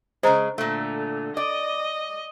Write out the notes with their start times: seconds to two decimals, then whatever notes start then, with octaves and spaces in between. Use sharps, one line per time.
0.23 C#3 G#3 C5 A#5
0.58 A#2 D3 A3
1.37 D5 D#5